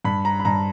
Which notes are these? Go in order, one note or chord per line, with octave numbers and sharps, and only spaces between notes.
G2 B5
A#5
B5
G2 A#5